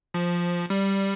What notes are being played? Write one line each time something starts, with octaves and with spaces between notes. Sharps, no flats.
F3
G3